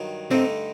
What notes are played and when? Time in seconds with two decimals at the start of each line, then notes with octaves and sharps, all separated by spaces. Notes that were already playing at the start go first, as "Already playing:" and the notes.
Already playing: G2 D#3 F#3
0.31 G2 D3 A3 C4 D#4